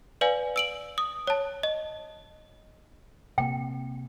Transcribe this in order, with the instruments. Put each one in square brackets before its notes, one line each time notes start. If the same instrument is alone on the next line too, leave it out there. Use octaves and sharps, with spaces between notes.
[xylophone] B4 D5 F5 G#5
E6 D7 F#7
D#6
C#5 A5
D#5
[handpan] C3 A#3 [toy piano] G5